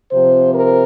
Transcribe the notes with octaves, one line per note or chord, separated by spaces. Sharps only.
C3 F3 C4 C5
A#4